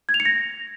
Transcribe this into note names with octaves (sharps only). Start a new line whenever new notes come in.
G#6
F7
C#7
A#6